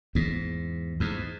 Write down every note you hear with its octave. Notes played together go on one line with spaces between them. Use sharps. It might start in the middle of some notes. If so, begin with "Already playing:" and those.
E2 G#2
E2 G#2